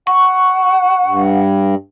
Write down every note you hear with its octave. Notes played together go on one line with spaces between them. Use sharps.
F#5 C#6
G2